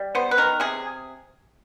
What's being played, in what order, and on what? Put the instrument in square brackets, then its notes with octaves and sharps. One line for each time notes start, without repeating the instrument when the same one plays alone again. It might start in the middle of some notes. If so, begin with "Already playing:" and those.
Already playing: [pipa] G3
B3 C5
B4
D#3 A#4
C3 G#4